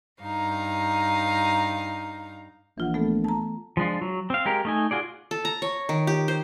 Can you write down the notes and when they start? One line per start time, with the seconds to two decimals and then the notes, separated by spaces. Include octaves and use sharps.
0.22 G2 D#4 F5 A#5
2.78 A#1 E3 F4 F#5
2.94 A3 B3 A4
3.24 A5 A#5
3.77 F3 G#3 D4 F4
4.02 F#3
4.30 C4 F5
4.45 G#3 G4 A#4
4.65 A3 D#4 G#5
4.91 F4 F#4 G#4 D5
5.31 A4
5.45 A#5
5.62 C#5
5.89 D#3
6.07 G4
6.28 C5